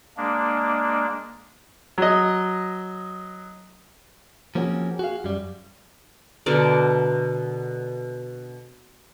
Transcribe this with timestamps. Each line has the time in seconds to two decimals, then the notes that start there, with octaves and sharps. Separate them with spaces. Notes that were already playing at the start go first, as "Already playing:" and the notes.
0.17 G#3 A#3 D4
1.98 F#3 D#5
4.55 F3 A#3 C4 C#4 F#4 G#4
4.99 F#4 G#4 F5
5.24 F#2 G3
6.46 B2 D3 A#4 D5